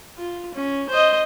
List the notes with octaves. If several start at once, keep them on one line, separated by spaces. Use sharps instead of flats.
F4
C#4
C5 D#5